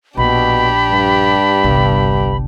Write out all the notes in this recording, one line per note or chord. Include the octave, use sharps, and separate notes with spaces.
A#1 B2 D4 G4 B5
G2
G1 C2